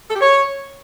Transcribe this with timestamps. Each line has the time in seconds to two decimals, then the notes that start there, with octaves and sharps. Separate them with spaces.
0.09 A4
0.15 G4
0.21 C#5